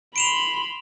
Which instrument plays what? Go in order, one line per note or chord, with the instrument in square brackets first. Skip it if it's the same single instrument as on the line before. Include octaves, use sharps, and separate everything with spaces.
[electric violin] B5 C6 [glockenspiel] D7 E7 F7